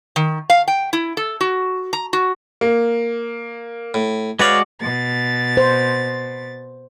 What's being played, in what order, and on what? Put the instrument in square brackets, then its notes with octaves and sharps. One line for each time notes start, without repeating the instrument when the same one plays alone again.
[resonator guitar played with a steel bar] D#3
F5
G5
E4
A4
F#4
A#5
F#4
[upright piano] A#3
[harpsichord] A2
[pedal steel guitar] G#3 F#4 D5 [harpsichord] B4 C#5 F5
[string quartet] B2 A6
[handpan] C5